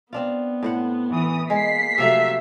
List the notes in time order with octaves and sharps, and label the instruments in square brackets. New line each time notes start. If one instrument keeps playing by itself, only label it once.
[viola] B3 [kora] C4 D4 F4
[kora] A2 C5 F#5
[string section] E3 D#6
[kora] G#3 [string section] A#3 B6 C7
[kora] C3 F3 A3 [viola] F#3 E5